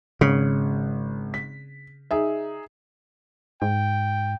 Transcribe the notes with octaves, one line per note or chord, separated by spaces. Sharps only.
G#1 C#3
B6
D#4 G#4 E5
G#2 G5